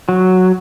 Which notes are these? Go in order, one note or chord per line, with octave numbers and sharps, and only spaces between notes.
F#3